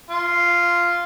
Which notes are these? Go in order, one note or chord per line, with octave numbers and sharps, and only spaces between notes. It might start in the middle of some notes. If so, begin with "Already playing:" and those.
F4